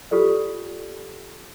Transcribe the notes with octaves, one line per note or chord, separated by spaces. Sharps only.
F4 G4 A4 D5